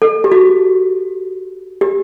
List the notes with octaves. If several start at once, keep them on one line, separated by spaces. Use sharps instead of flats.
A4
G4
F#4
G4